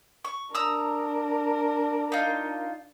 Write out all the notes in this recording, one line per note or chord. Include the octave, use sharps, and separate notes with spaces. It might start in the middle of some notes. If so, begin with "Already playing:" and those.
C#6
D4 A#4 A#5 D#6 E6
D#4 F4